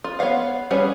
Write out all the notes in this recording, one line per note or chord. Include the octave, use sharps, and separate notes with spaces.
F4
B3 C#5 D5 F5 F#5
G3 C#4 G#4 B4 C#5